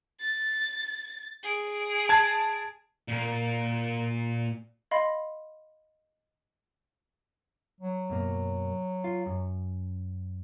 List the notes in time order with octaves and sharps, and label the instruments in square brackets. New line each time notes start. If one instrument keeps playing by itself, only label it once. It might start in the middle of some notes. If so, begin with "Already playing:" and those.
[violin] A6
G#4 D7
[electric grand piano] A5 G#6
[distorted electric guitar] A#2 A#4
[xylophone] D#5 F5 B5 C6
[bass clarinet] F#3
[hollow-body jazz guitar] F#2 B2 A#3
F4
F#2